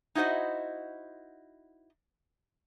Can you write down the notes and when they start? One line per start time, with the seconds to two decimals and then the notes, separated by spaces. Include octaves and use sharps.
0.15 D#4 E4 F#4 C5 D#5